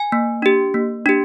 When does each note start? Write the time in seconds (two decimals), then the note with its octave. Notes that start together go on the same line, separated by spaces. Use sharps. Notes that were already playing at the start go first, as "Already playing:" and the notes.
Already playing: G#5
0.12 A#3
0.42 D4 G4
0.74 A#3
1.06 D4 G4